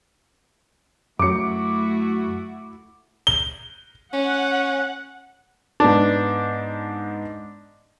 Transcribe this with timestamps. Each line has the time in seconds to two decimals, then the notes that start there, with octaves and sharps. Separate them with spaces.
1.19 F#2 F#3 A3 E4 F#4 D6 C#7
3.27 G7
4.13 C#4 F#5
5.80 G#2 B3 D4 A5